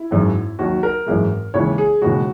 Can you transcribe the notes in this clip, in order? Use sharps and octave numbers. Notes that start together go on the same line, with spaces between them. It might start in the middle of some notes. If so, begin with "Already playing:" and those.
Already playing: E4
G#1 F#2 D#3 G#3
D#2 D#3 F#3 F#4
A#4
G#1 F#2 E3 G#3
D#2 C#3 E3 G#3 C#5
G#4
E1 D#2 C#3 G#3 F#4